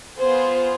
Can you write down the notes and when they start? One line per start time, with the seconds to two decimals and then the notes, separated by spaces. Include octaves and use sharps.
0.19 B3 F4 G#4 C5